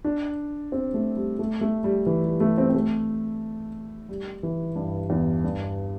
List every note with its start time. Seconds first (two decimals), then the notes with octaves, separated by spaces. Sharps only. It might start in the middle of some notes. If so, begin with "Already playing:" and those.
0.04 D4
0.72 C4
0.94 A3
1.16 G3
1.39 A3
1.61 A3
1.84 G3
2.06 E3
2.24 G3
2.40 A3
2.58 C4
2.70 C4
2.74 A3
4.09 G3
4.43 E3
4.76 G2
5.10 E2
5.44 G2